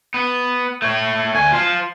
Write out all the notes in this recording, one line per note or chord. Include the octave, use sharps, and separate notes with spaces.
B3
A3 C#5
D2 G#5
F4 C5